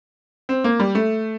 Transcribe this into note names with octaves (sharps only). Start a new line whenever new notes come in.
C4
A#3
G3
A3